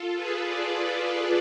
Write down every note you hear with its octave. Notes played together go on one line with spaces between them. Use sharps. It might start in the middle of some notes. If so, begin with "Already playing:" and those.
Already playing: F4 A4
G#4 B4
B4 D5
G#4 B4